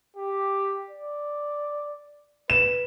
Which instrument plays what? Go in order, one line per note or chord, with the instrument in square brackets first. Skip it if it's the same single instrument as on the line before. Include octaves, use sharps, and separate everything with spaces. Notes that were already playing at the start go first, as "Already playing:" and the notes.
[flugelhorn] G4
D5
[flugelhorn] B4 [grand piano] E7